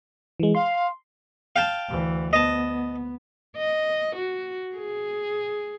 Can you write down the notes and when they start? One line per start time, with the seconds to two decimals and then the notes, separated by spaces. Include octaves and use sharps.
0.40 E3 G#3
0.55 F5 C6
1.56 F5 G5 A5
1.88 D2 E3
2.33 B3 D#5 A5
3.57 D#5
4.16 F#4
4.76 G#4